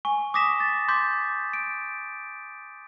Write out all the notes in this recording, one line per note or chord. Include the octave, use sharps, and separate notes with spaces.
G#5 C#6
D6 D#6 A#6 B6 E7
A6
C6 D6 G6 B6
D7